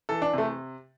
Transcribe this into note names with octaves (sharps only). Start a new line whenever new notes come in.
E3 A4
D4
C3 A3